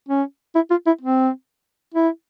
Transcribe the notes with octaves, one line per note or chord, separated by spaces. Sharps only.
C#4
E4
F4
E4
C4
E4